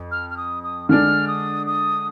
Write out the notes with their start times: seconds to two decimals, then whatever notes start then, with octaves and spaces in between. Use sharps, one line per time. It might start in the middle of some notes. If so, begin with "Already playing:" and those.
Already playing: F2
0.11 F6
0.30 F6
0.37 D#6
0.63 D#6
0.89 D3 G#3 D4 F6
1.28 D#6
1.67 D#6